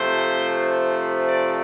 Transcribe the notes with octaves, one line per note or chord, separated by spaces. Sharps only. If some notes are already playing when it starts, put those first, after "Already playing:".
Already playing: C3 F3 A3 C5
D5